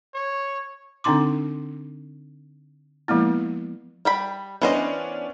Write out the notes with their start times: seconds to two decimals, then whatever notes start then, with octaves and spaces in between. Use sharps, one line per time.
0.14 C#5
1.04 D3 C4 D4 D#4 C6 D6
3.08 F3 G#3 A#3 B3 E4
4.05 G3 G5 B5
4.62 E3 B3 C#4 D4 C5 D#5